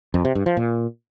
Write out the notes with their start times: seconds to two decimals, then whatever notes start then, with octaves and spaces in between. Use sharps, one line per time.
0.14 F2
0.25 C3
0.35 G2
0.46 F3
0.57 A#2